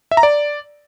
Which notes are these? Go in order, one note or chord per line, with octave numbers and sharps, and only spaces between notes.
E5
A#5
D5